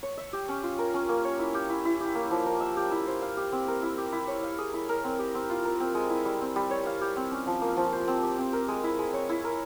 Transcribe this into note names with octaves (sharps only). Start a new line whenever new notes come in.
C#5
E5
G4
C#4
F4
A#4
C#4
A#3
C#5
E4
G4
E4
E4
G4
A#3
F3
A#4
E5
G4
E4
C5
F5
G4
C4
A#4
E4
G4
E4
C#5
F5
G#4
E4
A#4
C4
G4
C4
F4
A#4
C4
G#3
E4
G3
C4
G3
C#5
F5
G4
C4
C#4
F3
A#3
F3
C5
C4
G4
C4
A#4
G#3
E4
G#3
C#5
E4
A#4